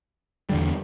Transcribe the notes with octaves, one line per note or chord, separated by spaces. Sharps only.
E2 D3 G3